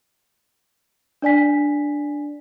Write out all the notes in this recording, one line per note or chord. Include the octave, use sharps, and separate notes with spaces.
D4 D5 G#5 B6